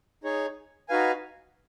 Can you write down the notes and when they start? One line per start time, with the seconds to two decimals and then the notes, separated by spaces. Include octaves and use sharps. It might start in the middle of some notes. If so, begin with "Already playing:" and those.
0.24 D#4 G#4 C#5
0.89 D#4 F#4 B4 F5 G#5